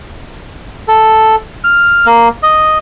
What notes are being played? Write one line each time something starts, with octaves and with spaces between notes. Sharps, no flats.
A4
F6
A#3
D#5